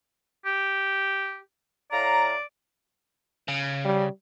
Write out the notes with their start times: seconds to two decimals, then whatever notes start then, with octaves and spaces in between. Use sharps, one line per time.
0.46 G4
1.92 A2 D5 F5 A#5
3.48 C#3
3.85 G3